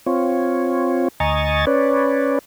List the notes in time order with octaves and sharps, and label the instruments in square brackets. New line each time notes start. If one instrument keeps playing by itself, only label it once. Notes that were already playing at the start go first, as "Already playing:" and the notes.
[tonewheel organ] C4 F4 C#5
D2 D#5 G#5 A#5 C#6 A6
C#4 B4 C#5 D5